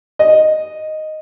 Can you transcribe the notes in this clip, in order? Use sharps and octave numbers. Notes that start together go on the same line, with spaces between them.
D#5